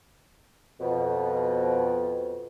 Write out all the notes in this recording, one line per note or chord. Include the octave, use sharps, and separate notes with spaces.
F2 B2